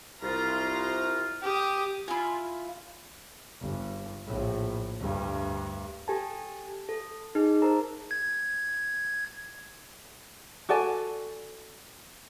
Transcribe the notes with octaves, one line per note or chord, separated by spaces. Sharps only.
C2 F4 A#5
G4 D#6
E4 F4 G#5
G1
A#1 A2
D2 G2
G4 A4 G#5 A5
A4
D#4 G#4
A#4 C5 A5 A#5
G#6
F#4 A4 D5 G#5